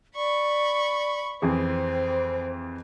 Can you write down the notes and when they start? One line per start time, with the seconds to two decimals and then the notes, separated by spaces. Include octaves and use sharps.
0.16 D5 B5 C#6
1.42 F2 E3 C4 G#4 C5